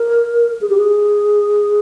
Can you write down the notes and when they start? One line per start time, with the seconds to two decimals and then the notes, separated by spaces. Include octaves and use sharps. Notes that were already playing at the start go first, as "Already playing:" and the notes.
Already playing: A#4
0.61 G#4
0.70 G4
0.77 G#4